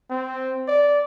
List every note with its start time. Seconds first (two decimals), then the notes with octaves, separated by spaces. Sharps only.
0.10 C4
0.68 D5